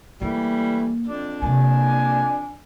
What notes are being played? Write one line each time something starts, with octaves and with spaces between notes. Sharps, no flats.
E3 G3 A3 A#3
F2 D4
C3 A#3 G#5